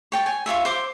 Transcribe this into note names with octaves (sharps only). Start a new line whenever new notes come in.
C#5 G5 A5
G#5
F4 F#4 C#5 E5
C5 D6